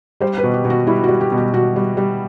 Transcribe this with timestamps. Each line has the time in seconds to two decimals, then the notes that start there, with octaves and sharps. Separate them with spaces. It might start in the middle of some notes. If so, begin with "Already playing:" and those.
0.21 G3 C5
0.38 B4
0.43 B2
0.54 G4
0.65 B2
0.70 F#4
0.87 G3 E4
1.04 F#4
1.09 G3
1.21 G4
1.32 B2
1.37 G4
1.53 B2 F#4
1.76 G3
1.97 G3